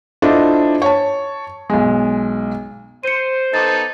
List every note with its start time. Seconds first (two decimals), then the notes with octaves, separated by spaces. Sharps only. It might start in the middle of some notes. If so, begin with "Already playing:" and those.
0.22 D4 E4 F4 A4 C5 D#5
0.82 C#5 A5
1.70 B1 G#3
3.04 C5 C#7 D#7
3.54 B3 D#4 A4 D6 A6